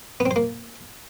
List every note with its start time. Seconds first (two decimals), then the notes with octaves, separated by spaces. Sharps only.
0.20 B3
0.26 C4
0.31 C5
0.36 A#3